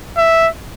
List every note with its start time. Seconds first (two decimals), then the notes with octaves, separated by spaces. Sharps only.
0.18 E5